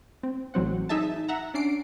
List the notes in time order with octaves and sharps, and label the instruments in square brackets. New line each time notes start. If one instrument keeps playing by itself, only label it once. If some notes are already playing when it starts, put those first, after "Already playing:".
[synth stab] C4
A1 F#3 C4 F#5
D#4 G#4 E5 A5
E5 F#5 A#5
C#4 D4 C7 D7